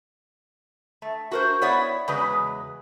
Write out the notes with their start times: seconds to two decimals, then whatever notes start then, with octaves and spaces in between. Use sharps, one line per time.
1.02 A3
1.31 F#4 A#4 C5
1.62 B3 E4 C#5 D5 F#5
2.08 E2 C#3 G#3 F#4 B4